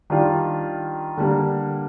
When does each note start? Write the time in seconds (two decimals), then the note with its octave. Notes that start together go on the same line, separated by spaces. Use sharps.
0.10 D#3 G3 D4 F4
1.17 D3 G3 A#3 D4